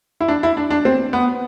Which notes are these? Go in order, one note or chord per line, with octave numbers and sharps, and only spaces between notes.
E4
D4
E4
D4
D4
C4
B3